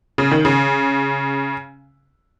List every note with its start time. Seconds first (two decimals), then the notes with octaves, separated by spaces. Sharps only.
0.18 C#3
0.31 D#3
0.45 C#3